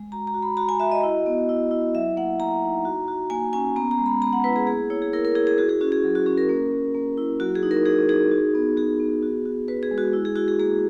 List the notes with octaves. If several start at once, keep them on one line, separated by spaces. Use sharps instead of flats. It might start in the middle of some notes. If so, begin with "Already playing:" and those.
Already playing: G#3
F#4 A#5
A#5
F#4
B5
F#4 A#5
G#5
F#4 E5
D#5
E4
B3
E4
E4
F#3 E5
A#3 F#5
F#3 A#5
D#4
F#4
F#4
A#3 G#5
C#4 G#5
B3 A#5
A#5
G#3
B5
B3 A#5
F#5
E4 B4
G#4
A#3 G#4
E4 C#5
G#4
E4 A#4
A#4
E4 G#4
G#4
F#4 G#4
G#4
C#4 F#4
G#4
F#3
F#4
C#4 G#4
A#4
A#3
A#3
A#3
E4
F#3 F#4
G#4
D#4
A#4
D#4 G#4
D#4 G#4
F#4
B3
F#4 G#4
B3
F#4
F#4
F#4 B4
G#4
G#3
F#4
E4
G#4
E4 F#4
G#4
A#3 G#4